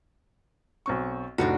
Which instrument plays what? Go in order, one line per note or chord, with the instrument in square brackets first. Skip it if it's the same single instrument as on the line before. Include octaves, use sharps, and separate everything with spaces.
[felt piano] B1 C4 C#6
[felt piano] F1 A2 [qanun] D4 D#4 F#4